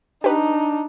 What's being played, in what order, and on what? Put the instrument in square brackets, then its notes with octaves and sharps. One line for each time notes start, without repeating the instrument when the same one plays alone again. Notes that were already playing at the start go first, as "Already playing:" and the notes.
[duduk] D4 [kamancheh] D#4 [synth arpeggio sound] G4 B4